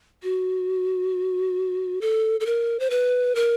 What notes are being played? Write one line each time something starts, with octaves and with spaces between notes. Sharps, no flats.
F#4
A4
A4
A#4
C5
B4
A#4